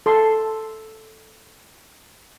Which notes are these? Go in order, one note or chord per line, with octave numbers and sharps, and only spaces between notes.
A4 C6